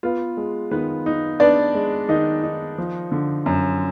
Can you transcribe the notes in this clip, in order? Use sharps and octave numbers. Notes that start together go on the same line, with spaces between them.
B3 F4
G#3
D#3 B3 B4
D#4
B3 D4 D5
G#3
D#3 D#4 D#5
D#4
F3
D3
F#2